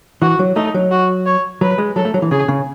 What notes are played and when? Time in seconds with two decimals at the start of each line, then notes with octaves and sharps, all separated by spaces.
0.22 E3 F#4
0.39 F#3
0.56 A3 D#4
0.74 F#3
0.91 F#4
1.26 C#5
1.61 F#3 B4
1.78 G#3
1.96 F#3 A4
2.05 A3
2.14 F#3
2.22 E3
2.31 C#3 G#4
2.48 C#3